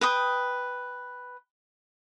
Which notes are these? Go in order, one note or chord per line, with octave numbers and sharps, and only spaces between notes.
B4 G5 D#6